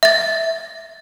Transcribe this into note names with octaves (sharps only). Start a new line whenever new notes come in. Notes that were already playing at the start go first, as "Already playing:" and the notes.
E5 A6